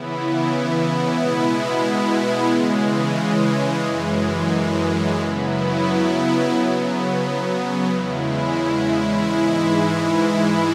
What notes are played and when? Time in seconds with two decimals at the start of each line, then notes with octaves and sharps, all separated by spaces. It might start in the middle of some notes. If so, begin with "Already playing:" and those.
Already playing: C#3 E3 B3 E4
1.12 B2 G#3 B3 E4
2.47 C#3 E3 G#3
3.82 F#2 E3 G#3
5.17 C#3 F#3 B3 E4
6.52 C#3 F#3 B3
7.88 E2 C#3 G#3 E4
9.23 G#2 E3 G#3 E4